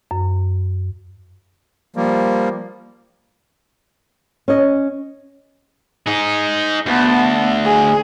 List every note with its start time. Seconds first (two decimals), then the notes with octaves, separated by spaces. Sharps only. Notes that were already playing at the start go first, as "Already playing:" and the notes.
0.11 F#2
1.96 F3 G3 A#3
4.48 C#4 D#5
6.07 D#4 G#4
6.86 D2 B3 A5
7.65 G#4 G#5